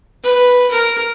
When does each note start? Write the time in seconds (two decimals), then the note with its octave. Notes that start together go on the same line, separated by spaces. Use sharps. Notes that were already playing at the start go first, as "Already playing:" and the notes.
0.23 B4
0.71 A#4